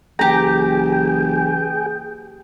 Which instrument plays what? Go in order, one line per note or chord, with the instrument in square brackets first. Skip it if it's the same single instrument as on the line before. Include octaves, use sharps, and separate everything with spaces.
[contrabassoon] F#1 [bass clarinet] E3 [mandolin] G4 A#5 [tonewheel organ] G#4 G5